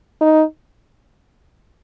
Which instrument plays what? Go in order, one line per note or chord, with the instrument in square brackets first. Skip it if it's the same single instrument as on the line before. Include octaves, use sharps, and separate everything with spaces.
[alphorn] D#4